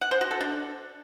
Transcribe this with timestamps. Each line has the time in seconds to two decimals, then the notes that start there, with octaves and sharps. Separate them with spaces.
0.01 F#5
0.11 C5
0.21 F#4
0.31 A4
0.41 D4